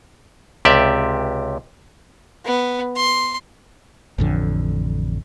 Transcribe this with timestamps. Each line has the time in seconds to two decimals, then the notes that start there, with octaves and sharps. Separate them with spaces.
0.65 C#2 C3 G4 D5 E5
2.45 B3
2.96 C6
4.18 A1 F2 D3